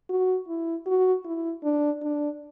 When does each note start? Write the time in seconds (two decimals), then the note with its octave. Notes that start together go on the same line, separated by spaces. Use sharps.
0.09 F#4
0.48 E4
0.86 F#4
1.25 E4
1.64 D4
2.02 D4